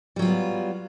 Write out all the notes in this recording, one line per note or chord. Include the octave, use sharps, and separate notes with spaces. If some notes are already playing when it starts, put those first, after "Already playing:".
F#3 G3 B3 C4 F4